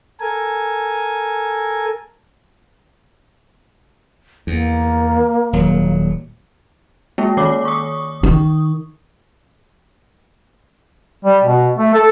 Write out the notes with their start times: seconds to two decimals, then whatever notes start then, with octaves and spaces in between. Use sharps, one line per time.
0.20 A4 A#4 G#5
4.47 E2 A#3
5.53 D#1 F#3
7.18 G#3 A#3
7.37 D#3 C#5 D6
7.65 C#6 D#6
8.23 D#3
11.25 G3
11.44 B2
11.78 A3
11.94 A4